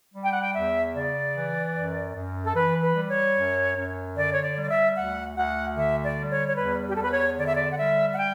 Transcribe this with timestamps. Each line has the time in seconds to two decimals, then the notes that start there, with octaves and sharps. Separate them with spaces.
0.14 G3
0.23 G5
0.32 F#5
0.42 G5
0.54 E2 E5
0.94 C#3 D5
1.34 E3
1.75 F#2
2.15 F#2
2.44 A4
2.55 E3 B4
2.82 B4
2.95 G3
3.09 C#5
3.35 F#2
3.76 F#2
4.16 D3 D5
4.32 C#5
4.42 D5
4.57 G3
4.62 D5
4.70 E5
4.96 D2 F#5
5.36 D2 F#5
5.77 D3 E5
6.04 D5
6.17 G3
6.31 C#5
6.48 C#5
6.57 E2 B4
6.88 G4
6.96 E2 A4
7.03 B4
7.11 C#5
7.37 D3 D5
7.46 E5
7.56 D5
7.71 F#5
7.78 G3 E5
8.13 F#5
8.18 G5